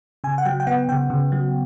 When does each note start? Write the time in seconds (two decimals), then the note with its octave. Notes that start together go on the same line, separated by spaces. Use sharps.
0.24 C#3 G#5
0.38 F#5
0.45 F#3 G5
0.60 G5
0.67 B3 F#5
0.89 C#3 G5
1.10 C#3
1.32 F#3